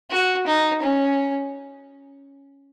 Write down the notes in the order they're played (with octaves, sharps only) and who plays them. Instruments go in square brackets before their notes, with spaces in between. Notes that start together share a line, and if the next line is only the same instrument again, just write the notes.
[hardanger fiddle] F#4
D#4
C#4